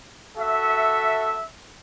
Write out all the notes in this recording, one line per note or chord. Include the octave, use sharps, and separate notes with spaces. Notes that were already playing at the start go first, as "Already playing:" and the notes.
F#4 A4 E5